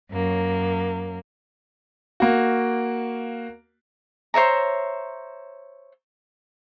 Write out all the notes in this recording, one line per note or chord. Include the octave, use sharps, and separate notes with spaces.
F#2 A#3
A#3 F#4
C5 C#5 E5 A#5